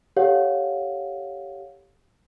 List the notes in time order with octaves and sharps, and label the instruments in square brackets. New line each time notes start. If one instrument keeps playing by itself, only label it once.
[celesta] G4 A4 C#5 F5 F#5